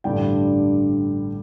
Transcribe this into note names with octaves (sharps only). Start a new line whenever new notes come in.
A1 G2 D3 G3 G5